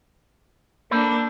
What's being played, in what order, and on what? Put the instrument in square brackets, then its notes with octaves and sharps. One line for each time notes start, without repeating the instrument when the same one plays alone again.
[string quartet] A#3 D4 [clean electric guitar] A4 C5 B5